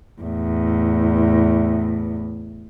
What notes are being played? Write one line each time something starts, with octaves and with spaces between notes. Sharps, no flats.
E2 A2